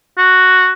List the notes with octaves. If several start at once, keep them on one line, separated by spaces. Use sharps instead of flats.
F#4